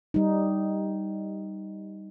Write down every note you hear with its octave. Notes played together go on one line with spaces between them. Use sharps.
G3 D#4